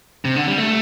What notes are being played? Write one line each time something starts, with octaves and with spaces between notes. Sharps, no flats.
C3
D3
G3
A3